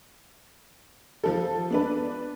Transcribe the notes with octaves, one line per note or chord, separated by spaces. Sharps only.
F3 A4
B3 D4 B4